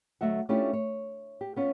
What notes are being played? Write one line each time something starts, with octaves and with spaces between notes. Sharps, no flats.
D2 F#3 A3 D#5 E5 F#5
A3 C#4 D4 E4 F4 G4
C#5
G4
B3 C#4 F4